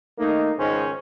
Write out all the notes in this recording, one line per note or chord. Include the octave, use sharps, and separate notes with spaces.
A3 A#3 D#4
C#2 G#2 D#3 C#4 C5